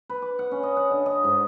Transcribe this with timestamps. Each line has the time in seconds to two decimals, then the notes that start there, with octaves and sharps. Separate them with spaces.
0.10 B4
0.22 D6
0.39 F#5
0.51 C#4
0.63 D#5
0.77 F#5
0.91 D3
1.06 D#5
1.24 G#2